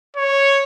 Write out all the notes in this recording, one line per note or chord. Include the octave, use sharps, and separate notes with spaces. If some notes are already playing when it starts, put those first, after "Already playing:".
C#5